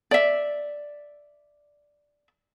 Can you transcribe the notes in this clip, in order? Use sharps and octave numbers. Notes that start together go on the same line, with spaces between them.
D5 E5